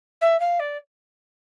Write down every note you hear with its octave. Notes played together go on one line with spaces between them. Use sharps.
E5
F5
D5